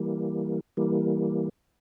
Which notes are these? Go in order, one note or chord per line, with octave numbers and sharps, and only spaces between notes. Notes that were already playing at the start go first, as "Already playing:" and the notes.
Already playing: E3 G3 A#3
E3 G3 A#3